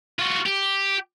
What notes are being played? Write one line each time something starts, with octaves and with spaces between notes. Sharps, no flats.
F4 F#4
G4